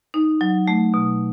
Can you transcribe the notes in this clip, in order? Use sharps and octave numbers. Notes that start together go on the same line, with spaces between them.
D#4
F#3
A3
B2